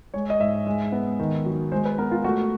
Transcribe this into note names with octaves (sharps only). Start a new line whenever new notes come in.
G#3 C#5
D#5
G#2 E5
G#3
B3
D#3
F#3
G#3 C5
B4
B3 A#4
F4
A3 F#4